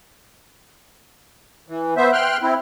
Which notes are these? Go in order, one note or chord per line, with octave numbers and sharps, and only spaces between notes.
E3
B3 C5 E5
G5 C6 F6 F#6
C4 E4